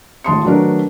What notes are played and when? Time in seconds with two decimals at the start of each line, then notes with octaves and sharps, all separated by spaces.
0.24 G#1 A2 A5 C6 D#6 C#7
0.45 D#3 F#3 A3 D4 A#4 B4